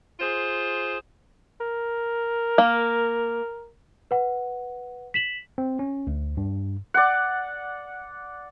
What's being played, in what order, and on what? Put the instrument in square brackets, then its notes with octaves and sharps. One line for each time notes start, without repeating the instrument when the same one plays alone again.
[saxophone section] F4 G#4 C5
[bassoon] A#4
[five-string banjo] A#3
[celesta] B4 F#5
B6 E7 F#7
[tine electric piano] C4
C#4
D2
G2
[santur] D5 F#5